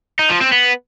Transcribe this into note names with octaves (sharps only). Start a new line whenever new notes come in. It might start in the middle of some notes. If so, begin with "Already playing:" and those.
D#4
F3
C4
B3